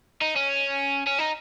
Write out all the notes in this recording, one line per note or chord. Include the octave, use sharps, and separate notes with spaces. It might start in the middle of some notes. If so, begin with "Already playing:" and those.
D#4
C#4
C#4
D#4